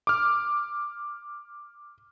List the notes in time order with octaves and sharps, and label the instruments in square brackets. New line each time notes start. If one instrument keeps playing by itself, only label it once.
[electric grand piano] D6 F6